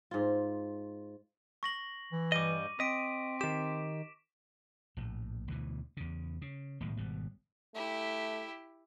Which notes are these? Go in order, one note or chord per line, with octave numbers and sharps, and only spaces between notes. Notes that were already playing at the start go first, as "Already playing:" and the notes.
G#2 F4
C#6 A#6 F#7
E3
G2 G3 D#5 D6 D#7
C4 D#5 B6 D7
D#3 G4 E7
A#1 A2
D2 B2 E3
E2 C#3
C#3
B1 A2 D#3 G#3
G#1 B2 G3
A3 E4 G4